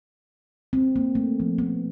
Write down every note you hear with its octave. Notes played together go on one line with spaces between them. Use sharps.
C4
A#3
A3
F3
B3